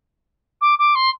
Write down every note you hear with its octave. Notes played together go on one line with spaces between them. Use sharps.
D6
D6
C6